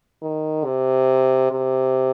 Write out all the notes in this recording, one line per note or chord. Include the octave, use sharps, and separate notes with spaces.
D#3
C3
C3